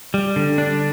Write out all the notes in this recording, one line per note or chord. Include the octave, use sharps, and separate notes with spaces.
G3
D3
D4